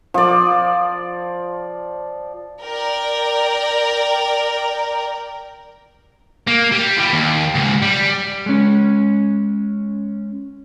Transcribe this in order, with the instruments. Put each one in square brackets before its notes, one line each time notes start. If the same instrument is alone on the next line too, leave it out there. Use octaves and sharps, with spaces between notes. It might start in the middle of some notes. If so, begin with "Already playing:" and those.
[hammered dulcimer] F3 D5
[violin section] A#4 D5 G5
[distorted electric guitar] A#3
G3
E3 G3
D#2
C#2 G#2
G3
[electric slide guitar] G#3 C#4